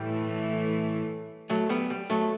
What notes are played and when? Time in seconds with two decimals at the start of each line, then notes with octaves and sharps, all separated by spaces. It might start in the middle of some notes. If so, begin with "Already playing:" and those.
Already playing: A2 E3 G3 A3
1.50 F#3 A3
1.69 G3 B3
1.90 G3
2.10 F#3 A3